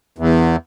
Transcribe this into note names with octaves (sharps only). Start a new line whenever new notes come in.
E2